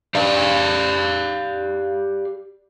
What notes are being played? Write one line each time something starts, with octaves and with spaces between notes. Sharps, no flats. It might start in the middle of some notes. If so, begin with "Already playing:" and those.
G4 D5 F5